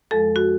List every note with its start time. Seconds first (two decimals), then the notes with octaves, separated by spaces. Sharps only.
0.11 F2 F3 G#3 A4
0.36 F#4